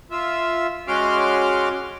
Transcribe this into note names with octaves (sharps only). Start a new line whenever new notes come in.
F4 E5
G#3 C#4 F#4 C6 D6 F6